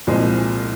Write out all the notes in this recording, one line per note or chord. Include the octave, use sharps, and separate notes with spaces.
C2 A#2 F3 G#3 C4